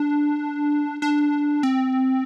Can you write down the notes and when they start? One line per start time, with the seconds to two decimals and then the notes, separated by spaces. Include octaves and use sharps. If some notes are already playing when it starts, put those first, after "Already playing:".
Already playing: D4
1.02 D4
1.63 C4